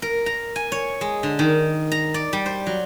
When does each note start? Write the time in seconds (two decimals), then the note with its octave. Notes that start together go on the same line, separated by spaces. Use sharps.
0.02 A#4
0.26 A#5
0.56 G#5
0.72 C#5
1.01 G#3
1.23 D3
1.39 D#3
1.92 A#5
2.14 D5
2.33 G3
2.46 C5
2.67 F#3